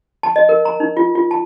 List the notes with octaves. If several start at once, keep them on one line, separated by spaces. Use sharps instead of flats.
A5
D#5
A#4
A#5
D#4
F4
F4
A5